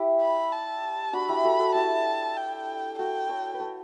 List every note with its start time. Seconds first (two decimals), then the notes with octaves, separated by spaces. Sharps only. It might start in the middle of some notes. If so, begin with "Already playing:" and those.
Already playing: E4 G4
0.21 B5
0.52 A5
1.13 D4 F#4 B5
1.28 E4 G4
1.44 F#4 A4
1.59 F#4 A4
1.75 E4 G4 A5
2.37 G5
2.98 F#4 A4 G5
3.29 A4 C#5
3.54 B4
3.60 A4 C#5